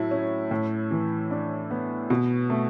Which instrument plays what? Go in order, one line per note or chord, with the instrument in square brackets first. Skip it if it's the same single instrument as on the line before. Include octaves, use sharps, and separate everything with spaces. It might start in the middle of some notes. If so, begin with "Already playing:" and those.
Already playing: [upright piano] A2 F#3 E4
C#4
A2
E3
D4
B3
B2
A3